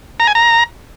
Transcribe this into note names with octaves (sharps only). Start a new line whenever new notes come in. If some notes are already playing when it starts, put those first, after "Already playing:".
A#5
G#5
A#5